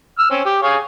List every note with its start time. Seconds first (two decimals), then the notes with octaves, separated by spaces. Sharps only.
0.19 E6 F6
0.30 C4 C#4
0.45 G4
0.62 G#4 C#5 F5